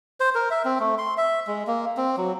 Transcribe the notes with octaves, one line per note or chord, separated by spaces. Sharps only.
C5
A#4
E5
C4
A3
C6
E5
G#3
A#3
C4
F#3